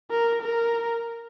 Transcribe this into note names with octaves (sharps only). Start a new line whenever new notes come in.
A#4
A#4